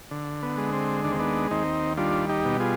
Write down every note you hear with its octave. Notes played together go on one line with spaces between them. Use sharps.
D3
B3
G#3
C4
D#2 D4
C4
B3 D4
D#2 C4 D#4
G3 D4 F4
D#4 G4
B2
F4 G#4